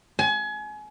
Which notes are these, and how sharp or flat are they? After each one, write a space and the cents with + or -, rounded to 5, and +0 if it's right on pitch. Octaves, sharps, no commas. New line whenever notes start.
G#5 +30